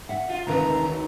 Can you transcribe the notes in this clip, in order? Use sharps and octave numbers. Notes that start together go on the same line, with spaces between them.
E5 F#5
F4
D2 C3 D#3 G#3 A#4 B4 A#5
D#3 F#3